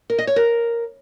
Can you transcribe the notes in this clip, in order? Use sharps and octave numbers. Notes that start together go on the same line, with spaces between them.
A#4
D#5
C#5
A#4